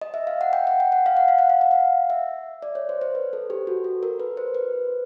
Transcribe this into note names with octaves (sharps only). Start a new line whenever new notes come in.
D#5
E5
F5
F#5
G5
F#5
G5
F#5
F5
F#5
F5
F#5
F5
F#5
F5
E5
D5
C#5
C5
C5
B4
A4
G4
F#4
A4
A#4
B4
C5
B4